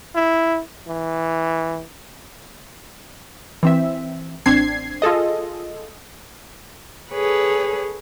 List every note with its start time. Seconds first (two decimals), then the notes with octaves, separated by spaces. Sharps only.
0.15 E4
0.88 E3
3.63 E3 C4 E5
4.46 A1 C4 D4 G#6 C7
5.02 F4 G#4 A4 D#5
7.13 G#4 A4 B4 C#5